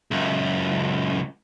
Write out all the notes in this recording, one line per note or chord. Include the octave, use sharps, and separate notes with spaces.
C#2 F#2